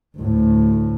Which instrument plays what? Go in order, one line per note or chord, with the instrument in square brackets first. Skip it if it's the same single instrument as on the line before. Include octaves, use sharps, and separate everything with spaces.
[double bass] D2 A2